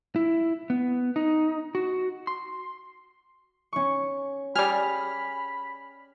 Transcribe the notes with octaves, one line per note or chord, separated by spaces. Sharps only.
E4
B3
D#4
F#4
C6
C#4 C#6
G3 G#4 B5 F6